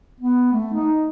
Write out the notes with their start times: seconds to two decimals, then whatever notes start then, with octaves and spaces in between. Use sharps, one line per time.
0.20 B3
0.53 A3
0.73 D#4